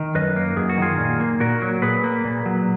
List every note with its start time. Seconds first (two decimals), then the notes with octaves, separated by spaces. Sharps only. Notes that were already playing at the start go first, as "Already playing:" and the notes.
Already playing: D#3
0.15 F#2 B4 D#5
0.36 A#3
0.57 F#2 G#4
0.69 F#4
0.78 D#3 F4 G#4
0.98 A#2
1.20 A#3
1.40 A#2 F#4 A#4
1.62 F#3
1.82 A#2 G#4 B4
2.04 A#3
2.25 A#2
2.46 F#3